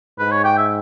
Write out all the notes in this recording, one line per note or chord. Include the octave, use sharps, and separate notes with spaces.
G#2 B4
C#5
G5
E5